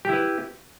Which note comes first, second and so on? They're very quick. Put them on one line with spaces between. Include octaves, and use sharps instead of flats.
G4 E4 B4